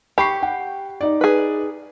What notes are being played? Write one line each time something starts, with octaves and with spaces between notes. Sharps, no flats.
G4 B5 C#6 C7
F#5 G5
D#4 D5
G#4 B4